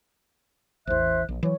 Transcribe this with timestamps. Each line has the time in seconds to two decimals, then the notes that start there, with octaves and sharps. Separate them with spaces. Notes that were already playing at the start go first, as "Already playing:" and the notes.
0.87 A1 E2 C5 E5 F#6
1.29 A#1
1.43 E3 F#3 C#5